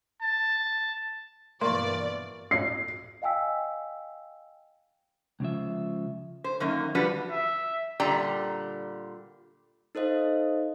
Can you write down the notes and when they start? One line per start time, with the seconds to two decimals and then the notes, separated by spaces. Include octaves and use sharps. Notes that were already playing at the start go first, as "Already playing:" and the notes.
0.22 A5
1.61 G2 B2 E3 A#3 D5 C6 C#6
2.51 C7
3.22 D#5 F5 G5 G#5 E6 B6
5.40 C#2 C#3 F3 E5
6.44 C5
6.60 F#2 D#3 A#3
6.95 F3 G3 D4 F#4 B4
7.31 E5
8.00 A#2 D3 G3 A#5
9.95 D#4 A4 C5 D#5 F5